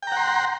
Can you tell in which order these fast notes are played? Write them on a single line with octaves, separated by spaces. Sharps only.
G5 A#5 F#5 C6